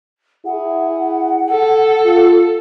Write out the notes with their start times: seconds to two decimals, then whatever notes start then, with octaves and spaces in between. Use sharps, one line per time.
0.46 E4 G#4 F#5
1.51 A4
2.05 F4